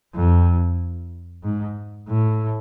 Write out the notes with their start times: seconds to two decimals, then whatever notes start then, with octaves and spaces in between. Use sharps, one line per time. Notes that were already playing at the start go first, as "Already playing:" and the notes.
0.15 F2
1.43 G#2
2.08 A2